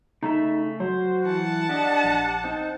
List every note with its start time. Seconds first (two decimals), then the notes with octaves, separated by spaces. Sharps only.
0.23 C#3 A3 D#4 E5
0.80 F#3 F#4 C5
1.24 E3 F#5 A5
1.69 D4 G4 D#5
2.04 A#1
2.44 C4 D#4